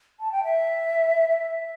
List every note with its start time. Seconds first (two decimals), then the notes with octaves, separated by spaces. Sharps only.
0.20 A5
0.32 G5
0.44 E5
1.30 E5